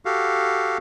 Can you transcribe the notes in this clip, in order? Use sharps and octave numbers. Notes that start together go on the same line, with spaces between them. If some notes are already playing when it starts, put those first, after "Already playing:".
F#4 G4 A4 F5